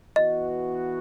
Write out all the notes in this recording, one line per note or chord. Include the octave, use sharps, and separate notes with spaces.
E3 B3 F#4 D#5